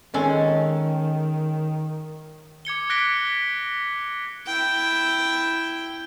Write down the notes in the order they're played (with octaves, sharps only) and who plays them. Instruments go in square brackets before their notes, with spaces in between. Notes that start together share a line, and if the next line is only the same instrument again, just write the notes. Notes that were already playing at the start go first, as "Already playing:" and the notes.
[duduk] D#3 [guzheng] G#3 [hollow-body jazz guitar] C#4 A4
[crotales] D6 G#6 C#7 G7
D6 F#6 A#6 B6 D7 G7
[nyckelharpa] E4 G5